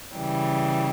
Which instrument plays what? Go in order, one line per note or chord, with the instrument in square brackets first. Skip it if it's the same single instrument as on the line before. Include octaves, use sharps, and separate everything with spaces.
[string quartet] C#3 E3 G3